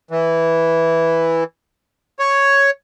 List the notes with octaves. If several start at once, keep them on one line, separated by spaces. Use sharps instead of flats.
E3
C#5